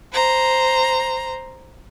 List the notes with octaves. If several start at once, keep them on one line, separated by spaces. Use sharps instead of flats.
C5 A#5